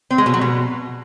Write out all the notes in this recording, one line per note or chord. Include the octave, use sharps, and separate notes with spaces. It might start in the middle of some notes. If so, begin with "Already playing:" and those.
C4
G#3
B2
F#3
B2